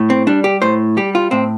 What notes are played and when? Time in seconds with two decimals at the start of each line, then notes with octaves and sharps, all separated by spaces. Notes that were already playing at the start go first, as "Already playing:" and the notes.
Already playing: A2
0.10 C4
0.27 G3 D4
0.44 G4
0.62 A2 C5
0.97 G3 G4
1.15 F4
1.31 A2 C4